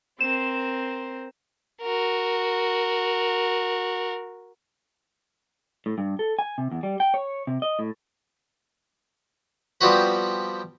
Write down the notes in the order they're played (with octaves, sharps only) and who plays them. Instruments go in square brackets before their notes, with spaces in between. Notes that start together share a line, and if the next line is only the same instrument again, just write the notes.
[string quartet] C4 A#4 C5 [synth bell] E7
[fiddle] F#4 A#4
[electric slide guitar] A2
G2
A4
G#5
C3
E2
G3
G5
C#5
C3
D#5
A2
[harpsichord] F3 G3 B3 C4 F#4 B4